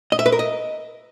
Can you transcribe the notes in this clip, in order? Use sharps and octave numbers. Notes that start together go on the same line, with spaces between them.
D#5
E5
B4
A#4
D#5